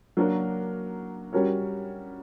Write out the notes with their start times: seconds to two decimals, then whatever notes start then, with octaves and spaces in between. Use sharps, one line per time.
0.17 F#3 A#3 D4 F#4 A#4
1.33 G3 C#4 F#4 A#4 C#5